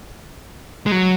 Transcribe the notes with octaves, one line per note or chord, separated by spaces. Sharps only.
G#3
F#3